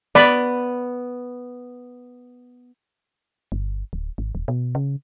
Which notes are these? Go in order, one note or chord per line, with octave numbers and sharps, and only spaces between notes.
B3 D5 B5
G1
D1
G#1
D#1
B2
C#3